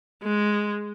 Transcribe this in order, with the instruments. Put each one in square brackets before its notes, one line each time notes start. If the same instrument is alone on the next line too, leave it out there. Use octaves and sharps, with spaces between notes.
[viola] G#3